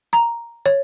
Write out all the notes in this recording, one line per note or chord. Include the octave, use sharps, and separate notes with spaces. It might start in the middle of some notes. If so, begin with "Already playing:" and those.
A#5
C#5